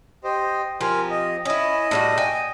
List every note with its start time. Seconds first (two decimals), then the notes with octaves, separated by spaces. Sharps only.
0.24 G4 C5 D#5
0.81 F3 C4 G4 A#4 G#5
1.11 D#5
1.45 C#4 E4 D#5
1.91 A2 G3 F#4
2.18 G5 G#5